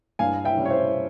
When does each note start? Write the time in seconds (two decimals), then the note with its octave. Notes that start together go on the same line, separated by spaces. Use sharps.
0.19 G2 F5 G#5
0.45 E5 G5
0.57 G3 C#4
0.65 C#5
0.70 C5 E5